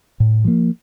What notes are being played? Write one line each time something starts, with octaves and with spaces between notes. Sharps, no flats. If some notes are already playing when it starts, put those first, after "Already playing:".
A2
F3 A#3